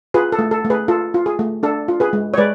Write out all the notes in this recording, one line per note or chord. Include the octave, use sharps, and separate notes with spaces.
F4 G#4 B4
A4
A3
A4
A3
G#4 B4
F4 A4
F4
G#4
A3
D4 A4
F4
G#4 B4
G#3
C#5
G#3 B4 D5